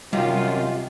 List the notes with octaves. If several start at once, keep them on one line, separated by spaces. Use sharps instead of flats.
F#2 C3 D#3 G3 F4 G4